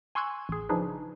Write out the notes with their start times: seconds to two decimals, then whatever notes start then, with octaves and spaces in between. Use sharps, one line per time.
0.15 G#5 C6 C#6 E6 F#6 G#6
0.49 A1 G#4
0.69 C#3 F3 D4 D#4 G#4 B4